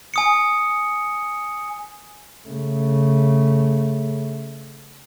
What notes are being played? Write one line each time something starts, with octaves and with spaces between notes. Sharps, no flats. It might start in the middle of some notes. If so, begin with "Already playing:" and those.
G#5 D#6 C#7
C#3 A3